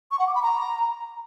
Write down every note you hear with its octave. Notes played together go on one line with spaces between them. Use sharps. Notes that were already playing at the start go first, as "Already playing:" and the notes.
C#6
F#5
D6
B5
A#5